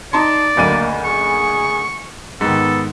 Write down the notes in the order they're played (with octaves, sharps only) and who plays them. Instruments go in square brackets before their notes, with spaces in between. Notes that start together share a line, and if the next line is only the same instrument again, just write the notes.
[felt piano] D#4 A5 C6 [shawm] D5
[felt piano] F#1 D2 D#7 [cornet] A#3
[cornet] G#4 [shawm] C#6
[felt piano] G#2 D#3 [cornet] B3 [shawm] A4